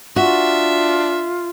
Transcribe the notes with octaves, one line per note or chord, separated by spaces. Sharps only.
D4 F4 F#4 E5